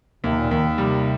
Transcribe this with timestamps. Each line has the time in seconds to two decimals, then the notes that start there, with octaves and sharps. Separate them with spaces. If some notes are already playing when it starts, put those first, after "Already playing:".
0.24 D#2 C3
0.37 A#2
0.51 D#2 D#3
0.78 C3 G3